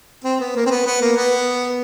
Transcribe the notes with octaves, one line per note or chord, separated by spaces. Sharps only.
C4
B3
A#3
C4
B3
B3
A#3
B3